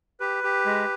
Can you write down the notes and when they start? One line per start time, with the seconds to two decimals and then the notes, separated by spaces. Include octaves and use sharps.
0.20 G4 B4
0.44 G4
0.65 G#3